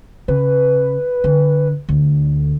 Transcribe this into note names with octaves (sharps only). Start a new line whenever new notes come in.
C#3 B4
D3
D2 D3